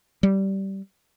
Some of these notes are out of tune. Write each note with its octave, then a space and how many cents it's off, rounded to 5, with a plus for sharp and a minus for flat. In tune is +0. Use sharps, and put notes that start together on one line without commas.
G3 -15